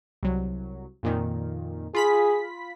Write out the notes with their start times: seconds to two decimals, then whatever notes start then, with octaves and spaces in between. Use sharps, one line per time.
0.23 C2 F#3
1.03 F2 A#2 D#3
1.95 F4 G#4 B5 B6